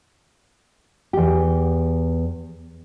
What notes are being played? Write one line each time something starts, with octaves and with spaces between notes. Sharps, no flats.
E2 G4